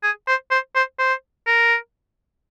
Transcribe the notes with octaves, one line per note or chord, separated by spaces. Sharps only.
G#4
C5
C5
C5
C5
A#4